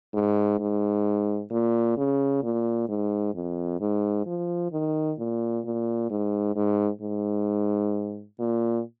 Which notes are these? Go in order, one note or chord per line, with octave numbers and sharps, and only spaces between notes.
G#2
G#2
A#2
C#3
A#2
G#2
F2
G#2
F3
D#3
A#2
A#2
G#2
G#2
G#2
A#2